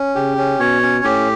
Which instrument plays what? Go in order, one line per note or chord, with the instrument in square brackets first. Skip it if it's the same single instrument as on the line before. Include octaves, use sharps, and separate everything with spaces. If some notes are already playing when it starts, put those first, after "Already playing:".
Already playing: [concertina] C#4
[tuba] C#3 [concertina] G4
[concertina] C#4
[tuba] B2 [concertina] C#5
[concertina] C#4
[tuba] A2 [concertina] G4